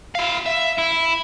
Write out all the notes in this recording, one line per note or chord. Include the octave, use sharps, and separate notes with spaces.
E4 F5
E5
E4